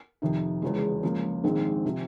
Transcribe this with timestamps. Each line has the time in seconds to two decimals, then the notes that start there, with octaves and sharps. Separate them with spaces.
0.22 F2 C3 D#3
0.62 E1 E2 C#3 F3 G#3
1.03 C#2 C#3 F3 A#3
1.44 A#1 G#2 D#3 G#3 C4
1.86 C3 F3